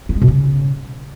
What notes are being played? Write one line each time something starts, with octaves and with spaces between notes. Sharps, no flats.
A#3
G#3
B2
C#3